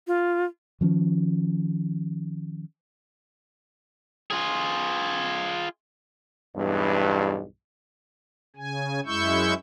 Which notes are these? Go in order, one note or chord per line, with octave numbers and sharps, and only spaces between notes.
F4
D#3 F3 C#4
F4 G#4
B1 E2 G2
C#3 G#5
F#2 G#3 E4 C#6 E6 G6